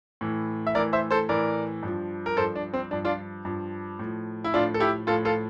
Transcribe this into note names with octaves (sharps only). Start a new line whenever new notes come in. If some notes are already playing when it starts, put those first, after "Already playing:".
A2 E3
E5
A2 E3 A#4 D5
C5 E5
A4 C5
A2 E3 A#4 D5
G2 F3
A#4
G2 F3 A4 C5
D4
C4
G2 F3 D4
D4 F4
G2 F3
A2 F3
E4
A2 F3 D4 F4
A4
E4 G4
A2 F3 F4 A4
F4 A4